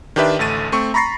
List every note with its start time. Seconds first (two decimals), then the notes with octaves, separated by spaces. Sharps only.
0.16 D#3 D4 G4 B4 E5
0.39 A1 D2 A3 A6 D#7
0.72 A3 C4 C#6
0.94 A#5 B5 C#6 A6 A#6 C7